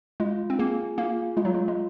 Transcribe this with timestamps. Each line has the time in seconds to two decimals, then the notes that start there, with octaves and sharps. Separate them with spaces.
0.20 G#3 F4
0.50 C4
0.59 A#3 G#4
0.98 A#3 F4
1.37 G#3 F4
1.45 F#3
1.54 G#3
1.68 G#3